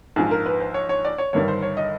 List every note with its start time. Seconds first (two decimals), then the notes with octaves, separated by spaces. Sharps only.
0.16 A#1 G#2 F3 G#4
0.31 A#4
0.46 B4
0.60 C5
0.74 C#5
0.89 C#5
1.05 D5
1.18 C#5
1.33 G1 G2 D#3 G3 C#5
1.48 C5
1.63 C#5
1.77 D#5